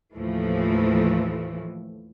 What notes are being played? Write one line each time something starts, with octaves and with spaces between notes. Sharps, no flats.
D#2 A2 E3 F3 A3